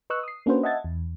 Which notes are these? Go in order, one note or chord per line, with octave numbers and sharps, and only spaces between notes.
B4 D#5 C#6 E6 F#6
D#6 C7
A#3 C#4 D4 F#4 B4 C5
D#5 E5 F#5 A5 G#6 A6
E2